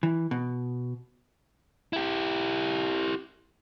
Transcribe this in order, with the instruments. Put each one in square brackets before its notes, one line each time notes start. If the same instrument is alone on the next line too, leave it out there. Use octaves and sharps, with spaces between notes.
[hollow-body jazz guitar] E3
B2
[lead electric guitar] E4 G4